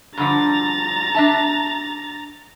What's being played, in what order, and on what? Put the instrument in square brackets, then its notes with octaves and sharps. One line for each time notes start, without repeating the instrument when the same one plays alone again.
[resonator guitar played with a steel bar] G2 D3 F3 [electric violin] A#5 A6
[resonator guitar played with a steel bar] D4 E5 A5